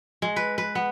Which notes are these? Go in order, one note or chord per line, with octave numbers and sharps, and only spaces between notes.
G#3
B4
B4
B3